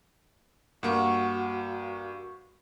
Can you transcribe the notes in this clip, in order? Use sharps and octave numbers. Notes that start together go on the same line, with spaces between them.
G2 A#3 F#4